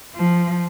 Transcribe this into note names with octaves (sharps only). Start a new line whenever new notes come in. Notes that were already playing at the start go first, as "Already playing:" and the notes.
F3